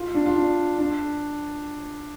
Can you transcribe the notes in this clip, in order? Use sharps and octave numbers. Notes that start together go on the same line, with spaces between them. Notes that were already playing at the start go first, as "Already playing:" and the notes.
Already playing: F4
D4
F4
D4
D4